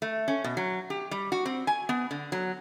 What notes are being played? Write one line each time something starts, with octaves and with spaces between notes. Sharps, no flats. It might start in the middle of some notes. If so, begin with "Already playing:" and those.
A3
C#4
B2
F#3
G4
G3
F#4
C4
G#5
B3
D3
F#3